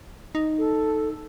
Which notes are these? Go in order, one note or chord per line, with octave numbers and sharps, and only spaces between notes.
D#4
A4